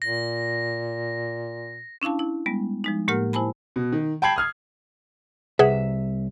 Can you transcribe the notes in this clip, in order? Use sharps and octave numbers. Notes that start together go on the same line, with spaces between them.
A#2 A#6
C#4 D4 E4 F5 A5
E4
G3 G#3 B3
F3 G#3 D#4
A2 A#3 G4 A#4 F#5 F6
E4 C5 G#5 A5 B5
B2
D#3
G5 A5 B5 G#6 C7 F#7
D#6 F6 G#6
C2 G#4 B4 E5 F#5